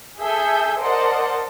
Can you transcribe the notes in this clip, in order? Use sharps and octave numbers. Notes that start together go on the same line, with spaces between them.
G#4 A4 E5 G#5 E6 G6
A#4 C5 D5 D#5 F#5 A5